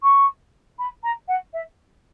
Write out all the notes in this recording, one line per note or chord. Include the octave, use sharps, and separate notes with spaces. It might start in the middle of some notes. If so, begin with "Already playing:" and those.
C#6
B5
A#5
F#5
E5